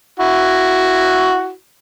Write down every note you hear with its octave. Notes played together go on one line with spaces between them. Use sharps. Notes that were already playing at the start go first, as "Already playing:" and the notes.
E4 F#4